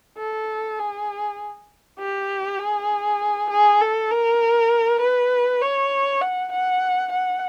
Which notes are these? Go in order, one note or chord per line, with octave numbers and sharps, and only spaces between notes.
A4
G#4
G4
G#4
G#4
A4
A#4
B4
C#5
F#5
F#5
F#5